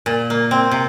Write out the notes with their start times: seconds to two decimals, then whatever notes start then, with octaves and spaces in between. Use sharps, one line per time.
0.06 A#2
0.30 A#3
0.51 C4
0.71 C3